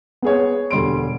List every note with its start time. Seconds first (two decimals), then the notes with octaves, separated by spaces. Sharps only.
0.22 B3 G#4 C#5
0.70 E1 D3 G3 C6 D7